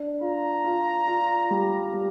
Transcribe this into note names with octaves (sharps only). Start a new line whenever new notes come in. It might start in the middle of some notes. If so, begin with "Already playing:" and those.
Already playing: D4
F4 A#5
F4
F4
G3
G3